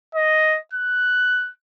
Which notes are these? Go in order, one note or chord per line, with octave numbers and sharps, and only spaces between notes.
D#5
F#6